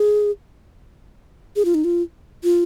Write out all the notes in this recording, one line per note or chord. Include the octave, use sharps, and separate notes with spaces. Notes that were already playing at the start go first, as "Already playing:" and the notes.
Already playing: G#4
G#4
F4
D#4
F4
F4